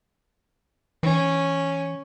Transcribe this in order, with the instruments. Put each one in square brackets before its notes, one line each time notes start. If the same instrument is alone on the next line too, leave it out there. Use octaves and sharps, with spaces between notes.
[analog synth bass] E3 [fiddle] C#4